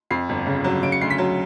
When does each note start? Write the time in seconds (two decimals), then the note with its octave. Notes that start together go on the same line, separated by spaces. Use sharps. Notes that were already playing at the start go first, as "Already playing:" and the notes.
0.11 F2 C7
0.29 G1
0.47 C#3
0.64 F#3
0.83 C#3 D7
0.92 C#7
1.01 D2 C7
1.10 B6
1.18 F#3